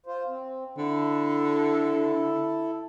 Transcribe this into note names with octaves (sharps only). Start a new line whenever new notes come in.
F4 C5
C4
D3 E4 A4